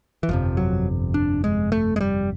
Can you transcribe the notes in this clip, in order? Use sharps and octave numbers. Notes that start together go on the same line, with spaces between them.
E3
G1 F2 C3 F3
F#3
D4
G#3
A3
G#3
G3